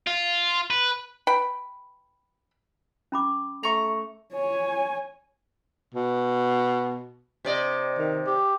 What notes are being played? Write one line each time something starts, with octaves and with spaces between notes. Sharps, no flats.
F4
B4
B4 G5 B5
C#4 B5 D6
A3 A#5 C#6
C#5 G#5
B2
C3 D5 D#5
D#3
G4